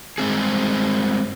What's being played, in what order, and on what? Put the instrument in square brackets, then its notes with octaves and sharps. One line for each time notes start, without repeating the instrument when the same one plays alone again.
[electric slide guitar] G2 G#3 C4 G#4